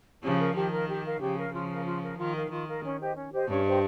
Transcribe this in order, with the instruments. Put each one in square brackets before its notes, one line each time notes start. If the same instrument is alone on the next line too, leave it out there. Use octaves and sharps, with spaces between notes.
[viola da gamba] C#3 F3 [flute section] G4
[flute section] A#4 F5
[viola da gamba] D#3 [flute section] G4
[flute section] A#4
F5
G4
A#4 F5
[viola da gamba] C#3 F3 [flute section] G4
[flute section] A#4 F5
[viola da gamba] C#3 F3 [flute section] F4
[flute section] A#4 F5
F4
A#4 F5
[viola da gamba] D#3 [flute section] F4
[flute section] A#4 F5
[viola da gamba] D#3 [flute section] F4
[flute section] A#4 F5
C#4
G4 C5 D#5
C#4
G4 C5 D#5
[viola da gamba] G2 [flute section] C#4
[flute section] G4 C5 D#5